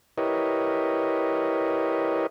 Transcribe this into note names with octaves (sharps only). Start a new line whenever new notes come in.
E4 G4 A#4 B4 C#5 D#5